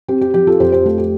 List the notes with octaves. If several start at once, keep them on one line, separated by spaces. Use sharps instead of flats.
C4 G4
G4
F3 G4
F4 A4
F2 G4 C5
G4 C5
A3 F4 A4
G4